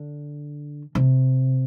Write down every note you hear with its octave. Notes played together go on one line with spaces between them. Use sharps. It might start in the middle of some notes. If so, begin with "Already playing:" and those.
Already playing: D3
C3